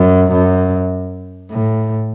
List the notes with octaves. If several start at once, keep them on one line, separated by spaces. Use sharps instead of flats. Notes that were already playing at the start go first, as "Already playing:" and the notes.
Already playing: F#2
F#2
A2